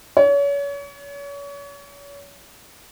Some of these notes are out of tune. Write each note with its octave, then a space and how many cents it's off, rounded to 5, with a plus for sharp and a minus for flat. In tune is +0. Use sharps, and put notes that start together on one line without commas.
C#5 +35